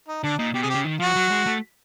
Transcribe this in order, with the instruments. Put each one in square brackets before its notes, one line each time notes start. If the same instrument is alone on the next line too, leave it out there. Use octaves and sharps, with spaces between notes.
[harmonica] D#4
[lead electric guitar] D3 [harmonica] D4
[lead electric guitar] A#2 [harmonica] D#4
[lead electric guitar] B2 [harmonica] G4
[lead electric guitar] C3 [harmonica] G#4
[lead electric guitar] C#3 [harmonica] G4
[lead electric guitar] D#3
[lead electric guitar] F3 [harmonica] F#4
[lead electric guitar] F#3
G#3
A3